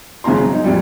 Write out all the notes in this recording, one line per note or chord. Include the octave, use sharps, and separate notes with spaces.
G#1 C#3 F3 F4 A#5 C6
F#3
D#4
F2 A#2 F#3 G3